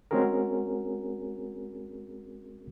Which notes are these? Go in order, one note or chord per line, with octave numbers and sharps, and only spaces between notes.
G#3 C4 C#4 F#4 G#4 A#4